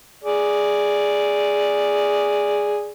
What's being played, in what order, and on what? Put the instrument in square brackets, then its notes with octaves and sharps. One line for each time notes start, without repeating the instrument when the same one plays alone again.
[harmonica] G#4 D5